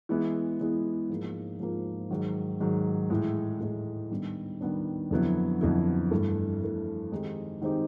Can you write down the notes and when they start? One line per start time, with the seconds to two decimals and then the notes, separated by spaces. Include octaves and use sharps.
0.09 E3 G#3 B3 E4
0.60 E3 G#3 B3 E4
1.09 G#2 F3 A#3
1.59 G#2 F3 A#3
2.10 G#2 D#3 F#3
2.60 G#2 D#3 F#3
3.10 A2 E3 G#3
3.60 A2 E3 G#3
4.11 D#3 G3 B3 D4
4.61 D#3 G3 B3 D4
5.11 F2 D3 F#3 B3 E4
5.61 F2 D3 F#3 B3 E4
6.11 G2 E3 A3
6.61 G2 E3 A3
7.12 D#3 G#3 C4 D#4 G4
7.62 D#3 G#3 C4 D#4 G4